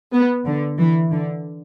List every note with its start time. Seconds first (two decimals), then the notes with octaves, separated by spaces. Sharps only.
0.13 B3
0.45 D3
0.78 E3
1.11 D3